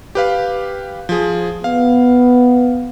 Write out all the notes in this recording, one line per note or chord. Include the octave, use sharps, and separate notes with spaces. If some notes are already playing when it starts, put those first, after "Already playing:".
G4 B4 F5
F3 G#4
B3 F5